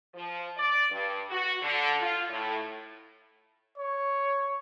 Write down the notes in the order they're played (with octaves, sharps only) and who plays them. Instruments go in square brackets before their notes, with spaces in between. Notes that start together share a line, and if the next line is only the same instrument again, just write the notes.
[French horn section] F3
D5
G2
F#4
D3
F4
A2
[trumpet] C#5